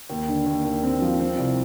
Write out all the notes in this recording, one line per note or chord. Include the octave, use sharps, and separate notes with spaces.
D#2
D3
D#2
D#2
C4
F3
C4
C2